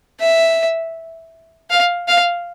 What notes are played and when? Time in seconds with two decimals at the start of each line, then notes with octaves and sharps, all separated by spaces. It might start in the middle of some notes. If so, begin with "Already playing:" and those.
0.20 E5
1.70 F5
2.08 F5